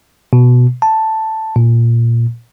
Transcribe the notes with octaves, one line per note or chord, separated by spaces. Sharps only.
B2
A5
A#2